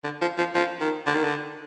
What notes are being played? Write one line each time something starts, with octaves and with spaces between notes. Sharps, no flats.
D3
F3
F3
F3
D#3
D3
D#3
D3